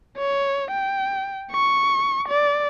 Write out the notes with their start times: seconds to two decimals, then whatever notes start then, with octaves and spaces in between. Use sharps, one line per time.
0.17 C#5
0.71 G5
1.51 C#6
2.28 D5